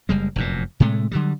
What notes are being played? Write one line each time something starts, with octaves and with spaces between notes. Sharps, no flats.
F#1 G3 G#3
F1 F#2 A#2
A2 C3 G#3 A3
D3 F#3 G3